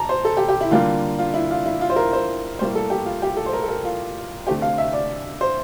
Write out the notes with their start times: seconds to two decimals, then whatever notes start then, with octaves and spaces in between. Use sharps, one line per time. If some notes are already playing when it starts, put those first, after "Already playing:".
Already playing: A5 A#5
0.09 C5
0.25 A4
0.37 G4
0.49 G4
0.61 E4
0.71 D3 G3 A#3 F4
1.19 F4
1.34 E4
1.51 F4
1.66 E4
1.81 F4
1.90 C5
1.96 A#4
2.13 C5
2.59 A2 G3 A#3 C5
2.75 A4
2.90 G4
3.06 F4
3.22 G4
3.37 A4
3.46 C5
3.53 A#4
3.63 A4
3.69 A#4
3.84 F4
4.47 D3 A3 C4 G4
4.62 F5
4.78 E5
4.93 D5
5.41 C5